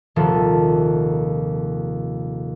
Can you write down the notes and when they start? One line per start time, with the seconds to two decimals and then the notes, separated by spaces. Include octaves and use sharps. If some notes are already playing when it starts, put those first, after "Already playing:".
0.16 D#1 D#2 C3 F3 A4